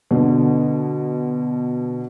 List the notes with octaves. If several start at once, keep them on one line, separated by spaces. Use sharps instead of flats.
B2 D3